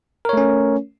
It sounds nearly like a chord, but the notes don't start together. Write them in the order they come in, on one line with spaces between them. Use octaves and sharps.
A#4 C#5 A3 C#4